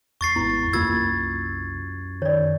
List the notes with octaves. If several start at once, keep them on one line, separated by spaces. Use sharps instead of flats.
E2 C#6 A6 C7
G#1 B3 E4
C2 F#2 A#3 F4 E6 G#6 A6
D#3 C#5 D5